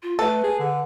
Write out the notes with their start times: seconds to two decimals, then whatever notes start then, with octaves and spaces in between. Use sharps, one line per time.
0.03 F4
0.19 A3 A4 B4
0.44 G#4
0.60 D3